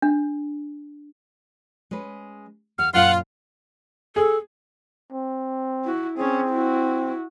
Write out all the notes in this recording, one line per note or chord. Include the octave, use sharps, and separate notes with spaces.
D4
G#3 C#4 B4
D#2 F#5 F6
F#2 A#2 F4 F5 F#5
G#4 A4
C4
E4 F#4
C4 C#4 G#4
E4 F#4